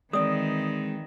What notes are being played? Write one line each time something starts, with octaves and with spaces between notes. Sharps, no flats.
D#3 E3 G#3 C4 D5 D#6